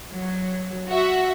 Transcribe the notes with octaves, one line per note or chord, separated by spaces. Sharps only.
F#3
F#4 E5